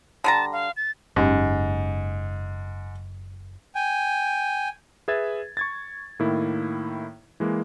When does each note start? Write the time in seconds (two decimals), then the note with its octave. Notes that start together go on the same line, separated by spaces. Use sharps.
0.24 D3 G3 A5 A#5
0.52 F5
0.77 A6
1.16 F#1 G#2 G#3 C#4 G4
3.75 G5 G#5
5.08 G#4 B4 E5 G#6 A6
5.57 C#6 G#6 A6
6.19 A2 D#3 A#3 E4
7.40 E3 G#3 A#3